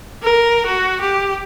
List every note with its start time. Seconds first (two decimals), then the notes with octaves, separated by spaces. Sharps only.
0.23 A#4
0.66 F#4
1.01 G4